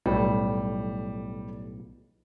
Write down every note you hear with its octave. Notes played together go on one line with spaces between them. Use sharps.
B1 A2 G3